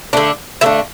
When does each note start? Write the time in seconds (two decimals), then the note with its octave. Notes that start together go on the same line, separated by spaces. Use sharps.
0.13 D3 A3 D4
0.61 D3 A3 D4 E5